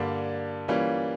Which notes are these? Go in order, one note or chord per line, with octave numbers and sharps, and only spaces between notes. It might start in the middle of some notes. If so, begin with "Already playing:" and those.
Already playing: G2 D3 G3 A#3 D4
E3 G3 A#3 C#4 F4